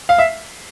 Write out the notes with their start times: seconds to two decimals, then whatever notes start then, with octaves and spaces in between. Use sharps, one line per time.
0.09 F5
0.18 E5